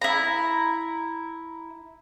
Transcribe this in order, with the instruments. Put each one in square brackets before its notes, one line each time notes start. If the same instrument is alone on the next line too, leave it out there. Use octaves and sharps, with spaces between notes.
[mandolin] E4 A#5